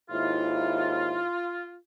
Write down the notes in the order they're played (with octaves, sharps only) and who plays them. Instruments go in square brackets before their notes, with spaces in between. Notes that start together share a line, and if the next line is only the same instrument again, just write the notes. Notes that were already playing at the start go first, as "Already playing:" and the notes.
[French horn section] D#2 G#2 E4 [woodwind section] F4